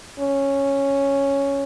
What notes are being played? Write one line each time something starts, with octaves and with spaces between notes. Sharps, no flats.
C#4